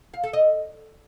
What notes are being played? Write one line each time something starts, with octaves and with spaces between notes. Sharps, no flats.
F5
A4
D#5